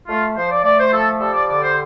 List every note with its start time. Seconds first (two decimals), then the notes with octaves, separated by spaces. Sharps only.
0.08 A3 F4
0.37 F3 C5
0.50 D5
0.64 A3 D5
0.79 C5
0.92 F3 A4
1.20 G3 A4
1.34 D5
1.48 D3 D5
1.62 C5